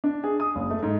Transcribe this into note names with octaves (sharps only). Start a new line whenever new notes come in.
D4
G#4
D#6
F#1
A3
G#2